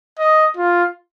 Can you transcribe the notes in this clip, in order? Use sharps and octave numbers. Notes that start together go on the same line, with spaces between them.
D#5
F4